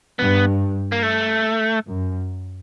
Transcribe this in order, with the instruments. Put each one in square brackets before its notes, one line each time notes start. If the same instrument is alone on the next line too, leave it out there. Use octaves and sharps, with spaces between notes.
[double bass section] G2 [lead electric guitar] B3
[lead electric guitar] A#3
A3
[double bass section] F#2